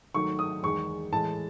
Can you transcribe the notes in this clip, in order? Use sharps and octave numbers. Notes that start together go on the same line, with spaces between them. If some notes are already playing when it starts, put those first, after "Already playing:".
G#2 D#3 F#3 A3 C#6
D#6
E2 D#3 G#3 C#6
A2 E3 G#3 A5